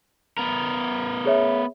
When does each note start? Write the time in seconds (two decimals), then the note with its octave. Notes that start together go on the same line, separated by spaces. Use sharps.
0.38 B3 A#4
1.26 G#4 C#5 E5